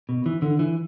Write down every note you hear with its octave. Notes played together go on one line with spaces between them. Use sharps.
B2
E3
D3
E3